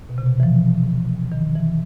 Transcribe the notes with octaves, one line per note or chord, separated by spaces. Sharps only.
B2
C3
B2
E3
F3
D#3
E3